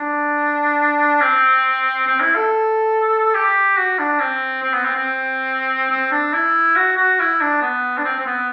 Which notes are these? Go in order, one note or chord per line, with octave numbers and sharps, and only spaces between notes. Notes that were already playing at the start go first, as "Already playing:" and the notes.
Already playing: D4
C4
C4
E4
A4
G4
F#4
D4
C4
C4
B3
C4
C4
C4
D4
E4
F#4
F#4
E4
D4
B3
D4
C4
C4
B3